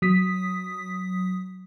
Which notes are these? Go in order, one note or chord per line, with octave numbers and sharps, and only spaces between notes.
F#3 D#6 B6